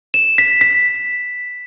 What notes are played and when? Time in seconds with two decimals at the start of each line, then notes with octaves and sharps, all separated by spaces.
0.14 E7
0.38 B6
0.61 B6